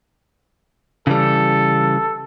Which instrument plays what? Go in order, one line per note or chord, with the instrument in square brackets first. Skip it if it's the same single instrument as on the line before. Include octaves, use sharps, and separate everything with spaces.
[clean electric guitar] C#3 E3 G3 [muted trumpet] A4